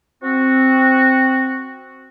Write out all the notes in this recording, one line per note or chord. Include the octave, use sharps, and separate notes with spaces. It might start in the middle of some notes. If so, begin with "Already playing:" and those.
C4 F#4